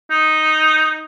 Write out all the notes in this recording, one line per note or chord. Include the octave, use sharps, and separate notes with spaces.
D#4